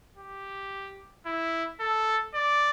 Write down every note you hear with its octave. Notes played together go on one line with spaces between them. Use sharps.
G4
E4
A4
D5